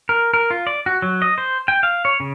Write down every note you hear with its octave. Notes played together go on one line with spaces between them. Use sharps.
A#4
A#4
F4
D5
F#4
F#3
D#5
C5
G5
F5
C#5
C#3